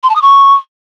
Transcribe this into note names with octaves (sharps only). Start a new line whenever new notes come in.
C6
A5
D#6
C#6